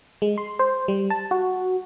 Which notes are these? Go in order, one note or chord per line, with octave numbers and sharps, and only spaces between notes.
G#3
C6
C5
G3
A5
F#4